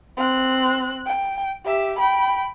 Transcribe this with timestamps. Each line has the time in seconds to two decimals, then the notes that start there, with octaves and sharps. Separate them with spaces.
0.17 C4 F#6
1.07 G5
1.65 G4 E5
1.99 G5 B5